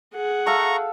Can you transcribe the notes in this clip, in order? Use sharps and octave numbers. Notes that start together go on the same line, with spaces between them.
G#4 F#5
A4 E5 F5 A#5 C#6